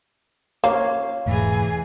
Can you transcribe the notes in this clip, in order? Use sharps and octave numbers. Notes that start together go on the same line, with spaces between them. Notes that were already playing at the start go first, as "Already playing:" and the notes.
A#3 C#5 F5
E1 G#2 E3 A3 G#4